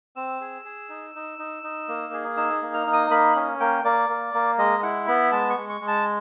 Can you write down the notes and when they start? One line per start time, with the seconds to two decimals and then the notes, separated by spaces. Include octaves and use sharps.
0.16 C4 E6
0.41 G#4
0.65 G#4
0.89 D#4
1.15 D#4
1.39 D#4
1.63 D#4
1.89 A#3
2.13 G#4
2.37 D#4 E6
2.62 A#3
2.74 F6
2.87 D#4
2.93 D#6
3.11 A#3 B5
3.35 C#4
3.60 A#3 G5
3.84 A#3 D5
4.09 A#3
4.34 A#3
4.58 G#3 D#5
4.83 E4 F#5
5.08 B3 B5
5.32 G#3 A5
5.50 C#6
5.57 G#3
5.69 C#6
5.81 G#3
5.88 A5